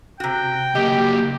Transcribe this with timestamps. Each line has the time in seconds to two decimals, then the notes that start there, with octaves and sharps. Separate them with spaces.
0.20 C3 F#4 G5
0.75 C#3 A#3 G4 D#5